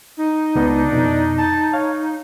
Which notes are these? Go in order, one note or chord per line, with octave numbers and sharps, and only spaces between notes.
D#4
C#2 B3 D4
F2 B2
A5
C#5 F5